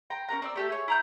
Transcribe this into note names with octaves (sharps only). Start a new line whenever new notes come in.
G5 A#5 C6
C#4 F#4 A#4 A#5
C4 D5 E6
A3 G4 A4
G#4 C#5
E4 A#5 G6